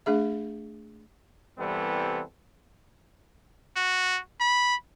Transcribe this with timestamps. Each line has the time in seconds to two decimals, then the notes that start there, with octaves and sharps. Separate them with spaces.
0.06 A3 D4 G#4 E5
1.58 C2 E3 G3 B3 C4 A4
3.77 F#4
4.41 B5